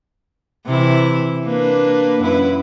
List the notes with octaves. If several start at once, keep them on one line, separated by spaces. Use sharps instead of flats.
C3 E3 E4
A#3 D4 B4
F#2 E4 B4